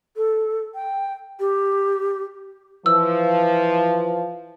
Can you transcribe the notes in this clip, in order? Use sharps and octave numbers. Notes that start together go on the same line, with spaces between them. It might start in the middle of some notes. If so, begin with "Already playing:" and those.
A4
G5
G4
E3 F3 E6